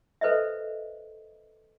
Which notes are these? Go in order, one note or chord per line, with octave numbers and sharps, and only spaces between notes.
A4 B4 C5 D#5 E5